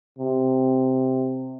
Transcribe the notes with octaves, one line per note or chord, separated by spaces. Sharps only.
C3